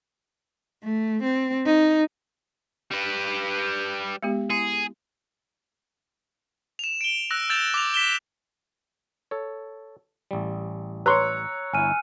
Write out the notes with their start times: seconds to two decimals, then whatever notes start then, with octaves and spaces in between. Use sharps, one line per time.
0.84 A3
1.23 C4
1.66 D#4
2.91 G3 B4
4.23 G#3 B3 G4
4.50 E4 G#4
6.79 E7 F7
7.01 D7 G7
7.31 E6 F#6 A#6
7.49 E6 G6 A6 E7 F7
7.74 D6 F7
7.94 B6 E7 G7
9.31 A4 C#5
10.31 A1 G3
11.06 B4 C#5 A#5 C6 C#6 E6 F#6 C#7
11.73 G1 E4 G#5 F6 D#7